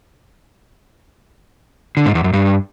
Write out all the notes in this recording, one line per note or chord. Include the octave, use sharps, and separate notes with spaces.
D3
G#2
E2
F#2
G2